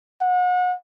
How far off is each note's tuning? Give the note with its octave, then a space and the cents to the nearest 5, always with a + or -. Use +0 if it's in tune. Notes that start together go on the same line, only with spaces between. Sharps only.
F#5 -35